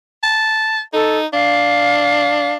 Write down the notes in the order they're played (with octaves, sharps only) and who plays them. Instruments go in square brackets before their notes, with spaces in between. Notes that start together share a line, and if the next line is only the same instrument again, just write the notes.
[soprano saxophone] A5
[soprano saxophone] D#4 [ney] A4
[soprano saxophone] D4 [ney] F5